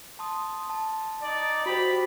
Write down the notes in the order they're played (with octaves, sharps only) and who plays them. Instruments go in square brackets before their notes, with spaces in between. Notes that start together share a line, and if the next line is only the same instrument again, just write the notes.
[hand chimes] A5 C6 D#6
A5
[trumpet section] D#4 D5
[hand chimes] F#4 C5 [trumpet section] G4 B5